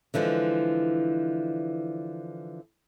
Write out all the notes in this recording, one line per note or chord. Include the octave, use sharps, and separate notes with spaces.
D3 E3 F3 G#3